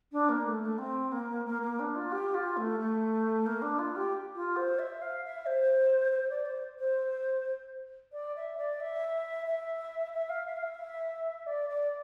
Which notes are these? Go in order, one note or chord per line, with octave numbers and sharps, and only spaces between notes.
D4
A#3
A3
A3
C4
A#3
A#3
A#3
D4
F4
G4
F4
A3
A3
A#3
D4
F4
G4
F4
C5
E5
F5
E5
C5
C5
D5
C5
C5
D5
E5
D5
E5
E5
E5
F5
E5
F5
E5
D5
D5